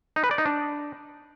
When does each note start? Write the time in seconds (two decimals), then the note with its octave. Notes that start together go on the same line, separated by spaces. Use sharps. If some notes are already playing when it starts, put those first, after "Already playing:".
0.16 D#4
0.24 B4
0.31 D5
0.38 D#4
0.46 D4